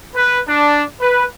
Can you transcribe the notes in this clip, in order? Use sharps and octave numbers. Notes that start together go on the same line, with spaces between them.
B4
D4
B4